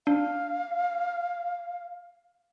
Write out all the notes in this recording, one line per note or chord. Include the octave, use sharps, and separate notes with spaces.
D4 F5